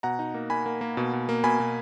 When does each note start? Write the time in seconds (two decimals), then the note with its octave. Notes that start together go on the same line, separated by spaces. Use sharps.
0.03 B2 F#5 A#5
0.19 D#4
0.34 A#3
0.50 A#3 G#5 B5
0.66 A#3
0.81 A#3
0.97 B2
1.13 B2
1.29 A#3
1.44 B2 G#5 B5
1.60 B2